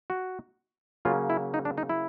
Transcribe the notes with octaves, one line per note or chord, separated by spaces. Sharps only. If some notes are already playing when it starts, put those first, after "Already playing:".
F#4
C#3 F#3 A#3 C#4 F4
E4
D#4
D4
D#4
E4